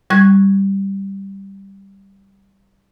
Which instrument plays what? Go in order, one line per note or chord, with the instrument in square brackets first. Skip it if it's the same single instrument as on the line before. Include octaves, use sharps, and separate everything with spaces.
[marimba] G3 C#6 F#6 G#6